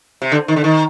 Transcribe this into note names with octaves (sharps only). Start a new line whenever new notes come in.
C3
D3
D#3
D3
D#3